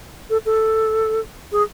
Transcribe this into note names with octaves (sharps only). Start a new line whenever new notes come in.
A4
A4
G#4